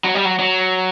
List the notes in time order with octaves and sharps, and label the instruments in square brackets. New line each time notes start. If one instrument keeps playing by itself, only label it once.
[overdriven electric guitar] F#3
G3
F#3
F#3